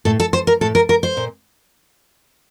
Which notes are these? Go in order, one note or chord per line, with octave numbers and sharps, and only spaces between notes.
A2 A4
A4
C5
A#4
A2 A4
A#4
A#4
C5
A#2